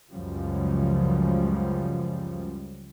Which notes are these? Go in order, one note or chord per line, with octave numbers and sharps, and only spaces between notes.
C#2 F#2 C#3 F3 G3